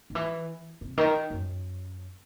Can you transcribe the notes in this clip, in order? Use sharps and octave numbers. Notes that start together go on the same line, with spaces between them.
D#3
E3
C3
D#3
F#2